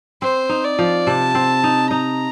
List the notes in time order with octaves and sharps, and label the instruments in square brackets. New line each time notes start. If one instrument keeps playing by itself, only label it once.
[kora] C4 [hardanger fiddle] C5
[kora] D#4
[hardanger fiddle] D5
[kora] F3
[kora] C3 [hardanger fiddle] A5
[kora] C4
D#4
[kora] D#4 [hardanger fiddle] A#5